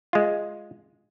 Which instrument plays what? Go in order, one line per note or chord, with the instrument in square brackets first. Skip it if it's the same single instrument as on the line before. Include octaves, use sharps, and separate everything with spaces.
[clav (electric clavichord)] G#3 F4